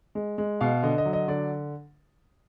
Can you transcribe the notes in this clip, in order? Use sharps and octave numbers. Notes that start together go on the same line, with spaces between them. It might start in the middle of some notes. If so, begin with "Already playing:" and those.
G#3
G#3
B2 F5
D3 D#5
D#5
F#3
D#5
D3 D5